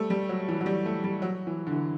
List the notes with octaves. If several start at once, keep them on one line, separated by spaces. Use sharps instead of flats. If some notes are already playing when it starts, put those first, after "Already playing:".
Already playing: G3 A3
G3
F#3
E3
F#3
G3
A3
G3
F#3
E3
D3
E3